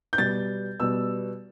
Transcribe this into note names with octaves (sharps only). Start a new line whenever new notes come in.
G6
B2 G3 A6
B2 G3 E6